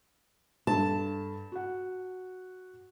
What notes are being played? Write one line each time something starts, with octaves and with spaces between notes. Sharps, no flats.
G2 A4 A5
F#4 F#5